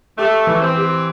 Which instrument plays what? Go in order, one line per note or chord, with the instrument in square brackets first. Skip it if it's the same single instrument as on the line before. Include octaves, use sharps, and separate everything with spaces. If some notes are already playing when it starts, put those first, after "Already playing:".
[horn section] A3 [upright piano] G4
[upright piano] E3
[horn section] C4
[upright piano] G4